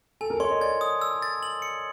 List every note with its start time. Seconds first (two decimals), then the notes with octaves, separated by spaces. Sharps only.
0.21 A4 G#5
0.30 A#4
0.40 C#5 C6
0.50 D#5
0.61 D5 G#6
0.81 D#6
1.01 E6
1.22 A6
1.43 F#7
1.62 C#7